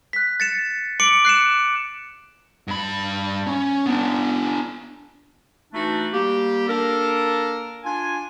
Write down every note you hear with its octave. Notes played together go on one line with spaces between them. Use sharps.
F#6 B6
A6 C#7 E7
D6 C#7 D7 F#7
F#6 C7 C#7 E7
G2 B5
C#4
B3 D4
E3 A3 D4 D#4 F#4
G3 A#3 G4
A#3 D4 A4 A#4
D4 F4 G#5